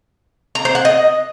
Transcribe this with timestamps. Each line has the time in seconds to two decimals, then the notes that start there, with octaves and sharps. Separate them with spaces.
0.55 A#5
0.65 C5
0.75 F#5
0.85 D#5